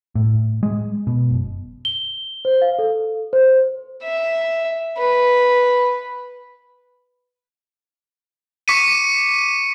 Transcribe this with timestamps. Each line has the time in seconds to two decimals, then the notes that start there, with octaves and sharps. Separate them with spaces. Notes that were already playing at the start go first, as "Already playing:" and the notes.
0.15 A2
0.63 G#3
1.07 B2
1.30 F#1
1.85 G7
2.45 C5
2.62 F5
2.79 A4
3.33 C5
4.04 E5
4.98 B4
8.68 C#6 D6 B6 C#7 D#7